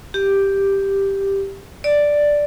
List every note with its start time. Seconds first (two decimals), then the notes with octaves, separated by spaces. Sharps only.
0.14 G4
1.84 D5